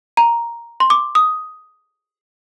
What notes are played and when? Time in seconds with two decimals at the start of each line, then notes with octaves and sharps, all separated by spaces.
0.17 A#5
0.80 C6
0.90 D6
1.15 D#6